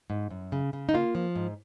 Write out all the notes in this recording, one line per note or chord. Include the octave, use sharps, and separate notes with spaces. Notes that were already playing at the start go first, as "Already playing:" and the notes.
G#2
F#2
C#3
C#3
D#4
A#3 F4
F3
G#2